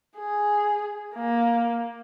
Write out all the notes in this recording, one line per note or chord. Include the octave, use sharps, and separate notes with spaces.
G#4
A#3